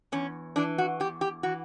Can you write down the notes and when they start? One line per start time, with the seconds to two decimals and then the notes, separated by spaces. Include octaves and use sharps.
0.12 E2 C#4
0.56 E3 D4
0.78 F#4
1.00 E2 G4
1.21 G4
1.43 E3 F#4